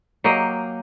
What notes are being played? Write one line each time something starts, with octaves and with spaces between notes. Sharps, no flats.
F#3 A#3 G4 D#5